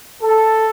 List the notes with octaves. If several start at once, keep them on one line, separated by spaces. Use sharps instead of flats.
A4